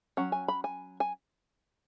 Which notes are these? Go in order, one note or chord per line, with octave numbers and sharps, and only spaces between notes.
F#3 C#4 F#5
G#5
B5
G#5
G#5